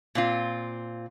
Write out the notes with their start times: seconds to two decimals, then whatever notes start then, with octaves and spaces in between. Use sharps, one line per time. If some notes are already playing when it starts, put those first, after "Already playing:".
0.15 A#2 C4 F4